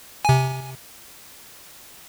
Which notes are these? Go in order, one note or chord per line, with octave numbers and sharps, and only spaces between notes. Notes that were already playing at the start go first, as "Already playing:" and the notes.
C3 G#5